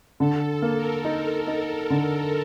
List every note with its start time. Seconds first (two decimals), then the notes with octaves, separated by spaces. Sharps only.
0.19 D3 A4
0.48 A4
0.62 A#3
0.76 A#4
1.05 D#4
1.47 D#4
1.90 D3